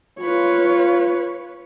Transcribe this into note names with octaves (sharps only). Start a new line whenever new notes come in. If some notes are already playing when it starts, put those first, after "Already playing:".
F4 B4 C#5